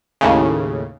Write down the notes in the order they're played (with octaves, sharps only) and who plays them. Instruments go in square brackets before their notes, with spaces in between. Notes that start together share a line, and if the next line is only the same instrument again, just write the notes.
[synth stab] D#2 A2 C#3